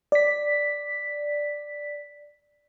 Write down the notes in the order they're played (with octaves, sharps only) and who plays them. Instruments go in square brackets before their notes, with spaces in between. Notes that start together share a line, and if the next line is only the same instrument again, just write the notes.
[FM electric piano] D5 B6